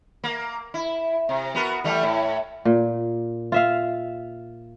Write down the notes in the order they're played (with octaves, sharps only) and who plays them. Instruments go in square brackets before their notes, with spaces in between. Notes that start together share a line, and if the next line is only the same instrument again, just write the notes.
[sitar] A#3
E4
C3
B3 F#4 A#4
E3 G3 A3
A2 E4
[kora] A#2
F4 E5 F5